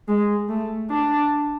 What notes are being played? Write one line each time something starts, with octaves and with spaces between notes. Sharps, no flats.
G#3
A3
D4